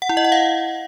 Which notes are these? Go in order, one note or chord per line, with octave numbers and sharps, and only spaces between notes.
F#5
E4
D#5
F#5
F5